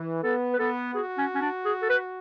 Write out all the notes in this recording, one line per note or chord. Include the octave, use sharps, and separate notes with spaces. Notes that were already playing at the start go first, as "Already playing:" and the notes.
Already playing: E3
B3 A4
B4
B3 A4
F#4 G#4
C#4
C#4
D4
G#4
A4
B4